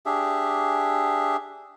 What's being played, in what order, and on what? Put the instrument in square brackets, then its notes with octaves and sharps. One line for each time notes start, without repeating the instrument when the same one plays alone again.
[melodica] D4 G4 G#4 E5